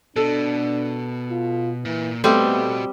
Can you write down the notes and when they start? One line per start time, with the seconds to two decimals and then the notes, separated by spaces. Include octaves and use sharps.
0.16 B2 D4 A4
1.30 F4
1.85 A#2 E3
2.24 G3 A3 B3 C4 F#4 D#5